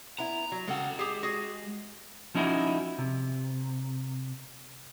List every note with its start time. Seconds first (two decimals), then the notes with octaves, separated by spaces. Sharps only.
0.18 B3 E4 A#5
0.52 F#3
0.67 C#3 G#3 A4 F#5 G5
0.99 G4 G#4
1.23 F#4 G#4
2.35 F3 C#4 D#4 E4 F#4
2.98 C3